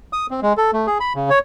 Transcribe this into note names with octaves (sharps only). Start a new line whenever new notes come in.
D#6
C4
G#3
A4
A3
G#4
B5
C#3
C#5